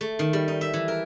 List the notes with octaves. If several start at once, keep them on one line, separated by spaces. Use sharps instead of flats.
A3
D#3
G3
D#4
E5
E3
A#4